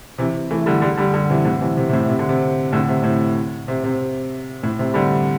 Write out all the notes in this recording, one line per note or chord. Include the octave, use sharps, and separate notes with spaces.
C3 E3
E3 A3
D3 G3
D3 G3
D3 G3
D3 G3
C3 E3
A2 D3
C3 E3
C3
C3
A2
C3
D3
C3
A2 D3
C3
A2
C3
C3
A2
C3
D3 G3